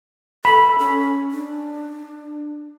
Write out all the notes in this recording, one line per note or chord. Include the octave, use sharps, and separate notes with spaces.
A4 B5
C#4
D4